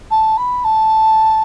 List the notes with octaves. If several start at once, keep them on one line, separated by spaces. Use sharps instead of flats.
A5
B5
A5